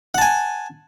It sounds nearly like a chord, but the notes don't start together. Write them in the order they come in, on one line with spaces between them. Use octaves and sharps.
F#5 A5 G#5